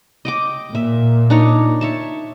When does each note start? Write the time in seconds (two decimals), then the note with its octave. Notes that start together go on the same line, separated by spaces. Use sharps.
0.25 D#5 G5 D6
0.75 A#2 E5
1.30 D4 D#4 C#5
1.81 C#5 E5 A5